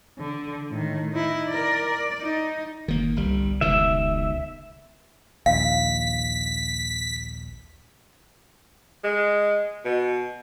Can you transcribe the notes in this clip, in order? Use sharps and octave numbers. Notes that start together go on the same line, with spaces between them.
D3
A2 D#3
D#4 E4
A#4 D5
D5
D#4
F#1 D#3 A#3
G1 C2 G3
E1 C#2 B2 D#3 E5
A#1 D#2 F5 B6
G#3
B2